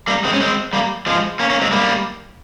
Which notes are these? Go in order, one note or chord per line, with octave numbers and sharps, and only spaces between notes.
G3 A#3
G#3 C4
C#4
G#3 C4
G3 A#3
F3 G#3
A#3 C#4
A#3 C#4
G#3 C4
G3 A#3